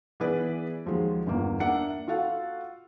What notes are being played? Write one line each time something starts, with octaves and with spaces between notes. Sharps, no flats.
E3 B3 G#4 B4 D5
D#2 F3 F#3 G#3
G1 E2 A#3
A#3 D4 E5 F#5 C#7
F4 F#4 A4 F5 F#5